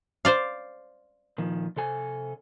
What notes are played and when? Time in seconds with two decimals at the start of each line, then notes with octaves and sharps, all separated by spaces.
0.25 C5 D5 F5
1.38 A#2 D#3 F3
1.76 C3 A4 G#5